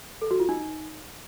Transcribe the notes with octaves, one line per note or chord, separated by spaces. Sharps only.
A4
F#4
F4
D#4